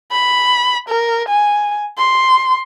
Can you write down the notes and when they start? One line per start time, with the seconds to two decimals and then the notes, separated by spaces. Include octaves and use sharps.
0.12 B5
0.89 A#4
1.29 G#5
1.98 C6